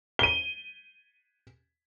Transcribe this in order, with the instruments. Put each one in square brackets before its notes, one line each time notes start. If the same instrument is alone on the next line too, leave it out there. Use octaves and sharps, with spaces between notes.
[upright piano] D#7 G7